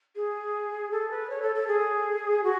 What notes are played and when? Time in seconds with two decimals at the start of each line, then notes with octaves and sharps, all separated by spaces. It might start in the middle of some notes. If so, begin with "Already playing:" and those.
0.16 G#4
0.91 A4
1.10 B4
1.29 C#5
1.42 A4
1.55 A4
1.67 G#4
2.43 F#4